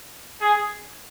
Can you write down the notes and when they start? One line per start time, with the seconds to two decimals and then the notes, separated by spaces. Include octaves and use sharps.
0.41 G#4